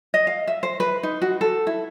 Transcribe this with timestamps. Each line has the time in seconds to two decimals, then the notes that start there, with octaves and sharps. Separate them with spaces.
0.14 D#5
0.27 F5
0.47 E5
0.63 C5
0.80 B4
1.03 D#4
1.22 F#4
1.41 A4
1.67 E4